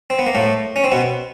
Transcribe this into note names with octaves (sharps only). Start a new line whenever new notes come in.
C4
B3
A#3
A2 A3
C#4
C4
B2 B3